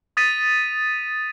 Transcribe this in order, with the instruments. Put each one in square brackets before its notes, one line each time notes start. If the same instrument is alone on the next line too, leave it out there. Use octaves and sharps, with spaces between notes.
[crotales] D#6 A6 B6 D#7